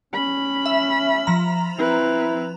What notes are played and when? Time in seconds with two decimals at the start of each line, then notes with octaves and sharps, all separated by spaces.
0.14 C#4 B5
0.66 E5
1.27 F3 A#5
1.78 C4 E4 B4